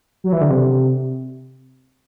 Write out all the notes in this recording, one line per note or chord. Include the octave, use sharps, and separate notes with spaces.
F#3
E3
D3
C3